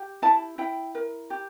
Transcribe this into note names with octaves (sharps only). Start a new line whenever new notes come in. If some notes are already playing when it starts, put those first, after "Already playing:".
Already playing: G4
E4 A5
E4 G5
A#4
G4